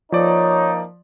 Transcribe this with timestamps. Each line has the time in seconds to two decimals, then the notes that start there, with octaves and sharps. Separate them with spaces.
0.12 F3 A#3 D#4 C#5 D5